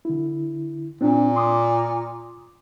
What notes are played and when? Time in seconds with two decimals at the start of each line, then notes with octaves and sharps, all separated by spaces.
0.05 D3 E4
1.01 A#2 C4 D4
1.36 C6 D6 D#6